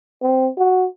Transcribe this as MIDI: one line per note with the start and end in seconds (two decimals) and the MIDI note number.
0.22 0.48 60
0.58 0.86 66